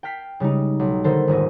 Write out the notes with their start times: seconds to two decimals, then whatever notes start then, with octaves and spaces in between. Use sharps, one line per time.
0.03 G5 A5 F6 B6 C7
0.40 C#3 G3 G#3 D#4
0.79 B1
1.04 D3 D#3 B3 A4 A#4 C5
1.28 D#1 G#1 G#4 A#6